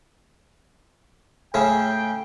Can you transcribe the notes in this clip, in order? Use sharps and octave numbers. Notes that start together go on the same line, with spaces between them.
A2 C#3 C#4 G5